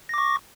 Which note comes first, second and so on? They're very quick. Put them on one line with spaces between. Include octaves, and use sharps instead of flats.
A#6 D6 C#6